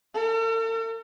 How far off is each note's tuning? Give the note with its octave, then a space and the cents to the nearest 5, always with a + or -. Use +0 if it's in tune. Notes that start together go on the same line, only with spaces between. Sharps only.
A4 +45